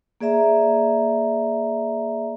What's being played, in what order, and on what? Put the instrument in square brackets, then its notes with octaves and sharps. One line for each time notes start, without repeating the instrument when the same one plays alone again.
[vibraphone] A#3 G#4 D5 E5 A#5